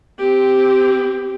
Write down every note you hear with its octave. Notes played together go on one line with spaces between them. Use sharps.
C4 G4